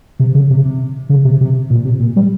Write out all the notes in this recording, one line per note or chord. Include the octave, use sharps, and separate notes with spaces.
C3
C#3
C3
C3
C#3
C3
C3
A#2
C3
A#2
G3